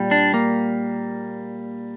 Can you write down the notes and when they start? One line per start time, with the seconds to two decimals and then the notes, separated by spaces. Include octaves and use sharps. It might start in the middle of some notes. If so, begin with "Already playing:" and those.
Already playing: A#2 G3
0.11 D4
0.34 A#3